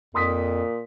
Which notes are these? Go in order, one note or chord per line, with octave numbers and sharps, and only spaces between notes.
F2 A#2 C6 D#6 B6